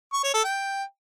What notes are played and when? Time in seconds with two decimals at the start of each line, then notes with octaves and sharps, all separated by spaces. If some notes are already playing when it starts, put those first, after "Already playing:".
0.13 C#6
0.24 C#5
0.34 A4
0.44 G5